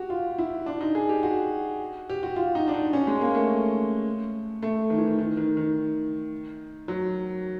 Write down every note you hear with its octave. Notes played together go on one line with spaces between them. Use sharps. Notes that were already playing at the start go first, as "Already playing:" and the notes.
Already playing: F#4 G4
F4
E4
D4
D#4
G#4
G4
F#4
G4
F#4
F4
D#4
D4
D#4
C#4
G#3
A#3
A3
A3
D#3
E3
D#3
D#3
D#3
D#3
F#3